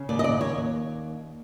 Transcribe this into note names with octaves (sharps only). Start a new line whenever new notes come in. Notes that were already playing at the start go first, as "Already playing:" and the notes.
Already playing: C#3
D#2 D5
D#5
D5
D#2 C#5